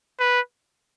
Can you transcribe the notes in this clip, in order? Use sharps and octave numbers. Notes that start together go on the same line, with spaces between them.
B4